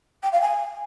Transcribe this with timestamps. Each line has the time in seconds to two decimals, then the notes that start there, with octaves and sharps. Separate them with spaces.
0.22 G5
0.32 F5
0.41 G#5